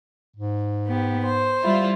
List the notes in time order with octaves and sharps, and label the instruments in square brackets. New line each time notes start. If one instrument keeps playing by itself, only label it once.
[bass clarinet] G#2
[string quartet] B3 G4
C5
[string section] G3 E4 F4